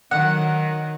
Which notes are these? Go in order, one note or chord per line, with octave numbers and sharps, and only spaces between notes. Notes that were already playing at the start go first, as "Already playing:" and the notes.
D#3 F#3 F#5